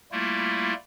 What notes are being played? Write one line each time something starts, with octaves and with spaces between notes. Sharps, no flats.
G3 A3 A#3 E4 F4